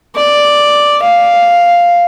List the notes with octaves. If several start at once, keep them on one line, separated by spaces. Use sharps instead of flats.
D5
F5